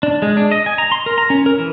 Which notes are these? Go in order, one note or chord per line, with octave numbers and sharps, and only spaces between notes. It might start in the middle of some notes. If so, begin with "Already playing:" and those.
D4
G#3
D4
D#5
G#5
A#5
C6
A#4
A#5
C#4
A#4
E3